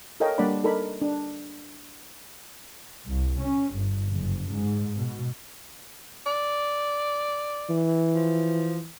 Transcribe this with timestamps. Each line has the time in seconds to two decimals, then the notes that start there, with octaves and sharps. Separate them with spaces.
0.20 A4 A#4 C#5 D#5 F5 G5
0.38 G3 A#3 D4 D5 F#5 B5
0.64 D#4 A4 A#4 D5 B5
1.02 D4
3.08 C2
3.40 C#4
3.74 G1
4.10 F#1
4.52 G#2
4.98 B2
6.26 D5
7.70 E3
8.15 F3